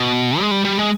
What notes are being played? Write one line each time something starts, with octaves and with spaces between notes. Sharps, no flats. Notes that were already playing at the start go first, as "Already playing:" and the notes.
Already playing: B2
G#3
G3
G3
G#3